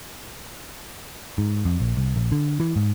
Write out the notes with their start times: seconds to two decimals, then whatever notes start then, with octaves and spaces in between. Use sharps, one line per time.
1.38 G#2
1.65 F2
1.80 A#1
1.97 C2
2.16 A#1
2.32 D3
2.60 E3
2.76 G#2